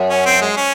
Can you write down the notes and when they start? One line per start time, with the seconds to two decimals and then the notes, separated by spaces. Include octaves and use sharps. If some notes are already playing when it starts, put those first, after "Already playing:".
Already playing: F#2
0.10 C#4
0.26 C4
0.42 G#3
0.57 C#4